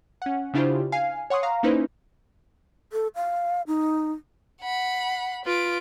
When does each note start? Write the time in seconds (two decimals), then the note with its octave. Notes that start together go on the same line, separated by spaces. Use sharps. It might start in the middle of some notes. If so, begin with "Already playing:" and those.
0.22 C#4 F#5
0.54 C#3 D4 E4 F4 G4 C5
0.92 F5 G#5 C7
1.30 C#5 F#5 C6 C#6 D#6 C7
1.43 F5 A#5
1.63 A#3 C#4 D#4 E4 B4 C5
2.93 A4
3.15 F5
3.67 D#4
4.61 F#5 B5
5.45 F4 B4 D6